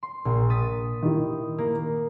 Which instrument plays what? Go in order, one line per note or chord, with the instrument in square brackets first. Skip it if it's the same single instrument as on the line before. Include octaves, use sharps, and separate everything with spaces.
[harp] C6
A#1
D#6 A6 B6
[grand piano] D#3 E4 G4
[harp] A#3